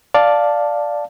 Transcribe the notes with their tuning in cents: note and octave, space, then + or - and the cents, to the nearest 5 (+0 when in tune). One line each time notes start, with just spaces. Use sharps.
D5 +0 F5 +5 A5 +0